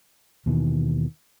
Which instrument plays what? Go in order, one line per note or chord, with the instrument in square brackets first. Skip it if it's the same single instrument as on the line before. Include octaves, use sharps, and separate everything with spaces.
[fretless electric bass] D#2 B2 D#3 E3